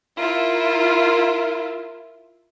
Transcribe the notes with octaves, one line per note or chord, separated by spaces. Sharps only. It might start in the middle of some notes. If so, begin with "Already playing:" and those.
E4 F4 A#4